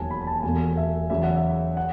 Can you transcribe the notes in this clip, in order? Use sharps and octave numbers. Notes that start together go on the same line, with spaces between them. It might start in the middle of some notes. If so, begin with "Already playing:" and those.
Already playing: E1 D#2 D#3 F#3 G#5 A5
B5
B5
A5
E1 E2 B2 A3 G#5
E5
E2 C#3 F#3 E5
F#5
E5
F#5